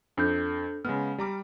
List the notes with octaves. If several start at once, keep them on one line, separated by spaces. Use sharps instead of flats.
F2 D4 A4 G6
C#3 G#3 B3 F6
G3 A#5 D6